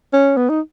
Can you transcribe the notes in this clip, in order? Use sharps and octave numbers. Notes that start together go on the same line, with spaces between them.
C#4
B3
D#4